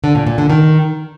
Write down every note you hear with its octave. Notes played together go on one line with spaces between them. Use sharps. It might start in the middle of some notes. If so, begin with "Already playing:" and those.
D3
A#2
A#2
D3
D#3